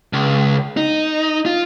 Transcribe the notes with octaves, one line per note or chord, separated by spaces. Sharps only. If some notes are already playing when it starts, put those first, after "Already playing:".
C#2
D#4
F4